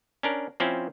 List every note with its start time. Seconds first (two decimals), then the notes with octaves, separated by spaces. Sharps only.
0.23 C#4 D4 A#4
0.60 F3 C4 C#4 E4